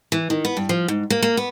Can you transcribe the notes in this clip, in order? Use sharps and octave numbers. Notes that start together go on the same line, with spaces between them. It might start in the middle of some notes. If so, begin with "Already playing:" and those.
E3
D#3
B3
G2
F3
G#2
A#3
A#3
B3